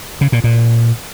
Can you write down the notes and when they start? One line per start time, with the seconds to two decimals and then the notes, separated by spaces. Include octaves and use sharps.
0.21 C#3
0.32 A#2
0.44 A#2